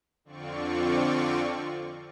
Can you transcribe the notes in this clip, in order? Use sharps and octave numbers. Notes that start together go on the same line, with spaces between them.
F2 D3 C4 F4 D5 C#6